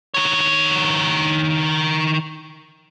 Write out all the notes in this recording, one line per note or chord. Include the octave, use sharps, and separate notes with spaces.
D#3 C#5